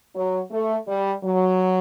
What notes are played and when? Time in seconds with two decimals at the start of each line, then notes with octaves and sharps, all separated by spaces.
0.15 F#3
0.51 A3
0.88 G3
1.24 F#3